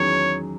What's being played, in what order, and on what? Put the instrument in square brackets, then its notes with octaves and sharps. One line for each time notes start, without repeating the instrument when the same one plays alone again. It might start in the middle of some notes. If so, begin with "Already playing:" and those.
Already playing: [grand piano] E2 D#3 F#3 C#4 G#4 [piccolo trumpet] C#5